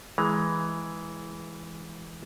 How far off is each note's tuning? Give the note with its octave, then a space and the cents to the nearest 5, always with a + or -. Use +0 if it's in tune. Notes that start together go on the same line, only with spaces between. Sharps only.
E3 +0 G#3 +0 A#5 +20